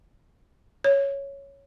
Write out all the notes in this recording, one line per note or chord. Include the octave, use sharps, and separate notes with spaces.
C#5